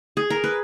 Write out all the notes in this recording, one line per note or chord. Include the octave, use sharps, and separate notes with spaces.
G#4
A#4
B4